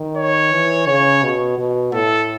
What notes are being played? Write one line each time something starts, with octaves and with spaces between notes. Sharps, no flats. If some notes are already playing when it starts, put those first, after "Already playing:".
Already playing: D#3
C#5
E3
C#3 C#5
B2
B2
A2 A4